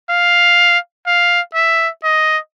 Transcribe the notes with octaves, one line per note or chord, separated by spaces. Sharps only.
F5
F5
E5
D#5